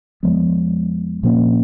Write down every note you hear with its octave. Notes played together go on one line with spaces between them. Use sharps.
F2 F3 G#3 B3
A#2 F3 A#3 C#4